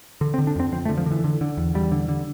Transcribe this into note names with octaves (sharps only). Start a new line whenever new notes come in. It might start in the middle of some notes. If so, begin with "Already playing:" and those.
D3
C4
D3
D4
F2 C4
F2 C4
A3
D3
F3
D3
E3
D3
D3
E2
E2 G3
D3
D3